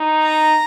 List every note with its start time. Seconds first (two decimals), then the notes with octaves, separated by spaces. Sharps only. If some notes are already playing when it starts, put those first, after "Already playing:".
Already playing: D#4
0.24 A#5